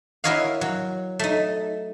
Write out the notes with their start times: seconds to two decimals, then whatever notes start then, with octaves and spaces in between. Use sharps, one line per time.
0.24 E4 F#4 A#4 C#5 D#5 F5
0.61 F#3
1.19 A3 D#4